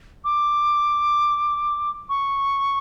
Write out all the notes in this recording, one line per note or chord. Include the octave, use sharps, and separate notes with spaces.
D6
C#6